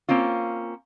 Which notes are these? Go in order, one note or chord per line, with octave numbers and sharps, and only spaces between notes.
A#3 C4 C#4 F4